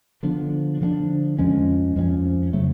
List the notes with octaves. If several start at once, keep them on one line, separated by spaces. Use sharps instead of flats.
D3 F3 B3 D4
D3 F3 B3 D4
F2 F3 G#3 C#4
F2 F3 G#3 C#4
C#3 F#3 A3